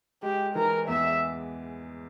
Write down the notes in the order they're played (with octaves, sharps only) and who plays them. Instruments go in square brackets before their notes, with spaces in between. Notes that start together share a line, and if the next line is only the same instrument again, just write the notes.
[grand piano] G#3 [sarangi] G4
[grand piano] E3 [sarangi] A#4
[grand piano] E2 [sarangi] E5